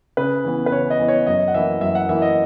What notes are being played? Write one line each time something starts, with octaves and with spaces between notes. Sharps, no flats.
C#3 B4
E3 B3
B4
C#3 C#5
D#5
E3 B3
C#5
F#2 D#5
F#5
E3 A#3 E4 E5
F#2 E5
F#5
E3 A#3 E4 E5
D#5